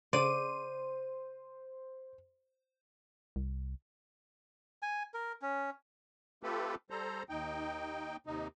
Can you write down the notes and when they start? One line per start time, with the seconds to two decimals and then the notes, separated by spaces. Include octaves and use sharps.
0.13 C#3 C5 D5 C6 D#7
3.36 C2
4.83 G#5
5.14 A#4
5.42 C#4
6.43 A3 C4 F4 G4 A4 B4
6.90 G3 A4 C5 A#5
7.29 D#2 D#4 G5
8.27 D#2 C3 D#4